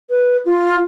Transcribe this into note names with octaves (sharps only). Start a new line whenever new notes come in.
B4
F4